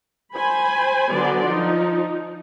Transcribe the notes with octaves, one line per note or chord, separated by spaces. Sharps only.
C5 G#5 B5
D3 F#3 B3 D5 C6
F3 D#4